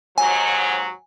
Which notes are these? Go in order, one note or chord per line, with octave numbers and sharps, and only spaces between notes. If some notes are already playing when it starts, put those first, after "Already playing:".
D#2 G#2 F#3 G#5